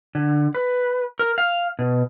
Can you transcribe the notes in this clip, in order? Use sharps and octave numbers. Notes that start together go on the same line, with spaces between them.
D3
B4
A#4
F5
B2